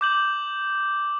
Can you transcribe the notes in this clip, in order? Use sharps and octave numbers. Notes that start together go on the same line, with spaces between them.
D6 G6 F#7